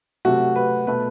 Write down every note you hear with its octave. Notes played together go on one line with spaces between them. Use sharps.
C3 F#3 A3 F#4
B4
B2 A3 B4